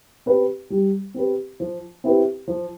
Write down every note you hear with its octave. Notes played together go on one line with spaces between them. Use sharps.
C4 G4 B4
G3
C4 G4 B4
F3
C4 E4 G4 B4
F3